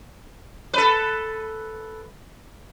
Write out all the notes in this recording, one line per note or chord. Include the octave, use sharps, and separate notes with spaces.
A4 B4